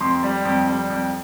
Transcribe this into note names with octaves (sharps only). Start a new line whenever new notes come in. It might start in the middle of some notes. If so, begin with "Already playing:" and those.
F2 C6
G3
F2
G3
F2